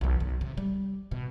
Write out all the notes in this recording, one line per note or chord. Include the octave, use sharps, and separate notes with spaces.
B1 E2
B1
C3
G3
B2